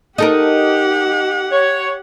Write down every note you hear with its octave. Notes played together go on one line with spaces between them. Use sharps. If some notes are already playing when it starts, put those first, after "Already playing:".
D#4 G4 A4 A#4 F#5
C#5